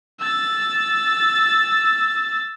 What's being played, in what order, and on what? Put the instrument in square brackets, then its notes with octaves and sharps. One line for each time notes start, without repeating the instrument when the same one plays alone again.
[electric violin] E6 A6